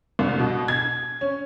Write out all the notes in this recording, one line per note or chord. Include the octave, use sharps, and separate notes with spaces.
C2
B2
G#6
C#4